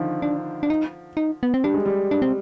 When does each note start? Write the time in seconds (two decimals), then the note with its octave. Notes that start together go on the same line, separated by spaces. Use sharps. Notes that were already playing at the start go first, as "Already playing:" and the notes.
Already playing: D3 D#3 F3
0.22 D4
0.63 D4
0.70 D#4
1.17 D#4
1.43 B3
1.54 C4
1.64 G3 D4
1.74 G#3
1.86 G3
2.11 D4
2.22 C4